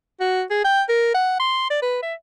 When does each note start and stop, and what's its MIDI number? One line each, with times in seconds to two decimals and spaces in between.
0.21 0.43 66
0.50 0.62 68
0.65 0.82 79
0.89 1.10 70
1.14 1.36 78
1.40 1.69 84
1.70 1.82 74
1.82 2.00 71
2.03 2.14 76